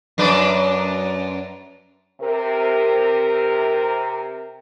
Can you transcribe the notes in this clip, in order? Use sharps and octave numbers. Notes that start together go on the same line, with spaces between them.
F#2 D4 B4
C3 A#4